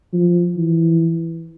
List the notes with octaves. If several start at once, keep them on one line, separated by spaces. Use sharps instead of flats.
F3
E3